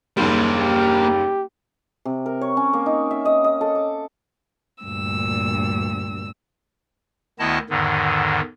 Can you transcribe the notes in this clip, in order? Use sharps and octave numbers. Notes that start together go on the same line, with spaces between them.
F#1 D#2 G3 A#3 C5
G4
C3
A#4
C#5
C#4
A#3
D#4
E5
D#5
D#5
A4
D6
D2 G2 A#2 E6
D2 D#3 B3 E4 D#5 A5
E2 G#2 D3 D#3